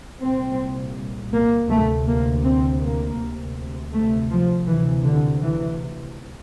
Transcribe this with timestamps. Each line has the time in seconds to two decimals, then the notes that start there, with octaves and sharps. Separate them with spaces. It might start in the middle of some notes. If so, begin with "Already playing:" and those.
0.21 C2 A#2 C4
1.33 A#3
1.69 D2 C3 A3
2.07 A#3
2.44 C4
2.81 A#3
3.19 D2 C3
3.93 A3
4.30 F3
4.67 D2 C3 E3
5.04 D3
5.41 E3